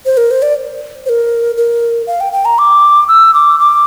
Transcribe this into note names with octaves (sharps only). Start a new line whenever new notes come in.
C5
A#4
C5
D5
C5
A#4
A#4
F5
G5
G5
A#5
D6
E6
D6
D6